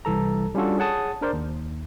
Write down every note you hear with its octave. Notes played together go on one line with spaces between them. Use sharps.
C2 E3 A4 A#5
G3 C#4 D4 F4 F#4 A4
G#4 C#5 F#5 A5 D#6
D4 A#4 C5 D5
D#2